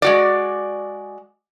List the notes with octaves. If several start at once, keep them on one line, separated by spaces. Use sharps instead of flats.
G#3 F#4 D5